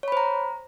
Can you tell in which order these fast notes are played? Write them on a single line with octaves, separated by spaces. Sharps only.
C#5 B5 C5 A#5